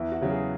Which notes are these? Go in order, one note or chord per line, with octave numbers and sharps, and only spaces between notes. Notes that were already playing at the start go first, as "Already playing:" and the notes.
Already playing: E2 E4
F#4
C#3 F#3
G#4